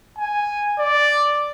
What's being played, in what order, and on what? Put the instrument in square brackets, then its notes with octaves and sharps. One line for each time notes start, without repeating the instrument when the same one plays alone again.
[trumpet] G#5
D5